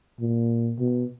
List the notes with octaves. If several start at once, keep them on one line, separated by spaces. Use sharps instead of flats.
A#2
B2